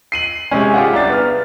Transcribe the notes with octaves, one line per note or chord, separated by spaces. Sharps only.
C7 D#7 F#7
C3 G#3 C#4
F4 G4 G#4 F5 F#5
C2 D4 A6
B3 F6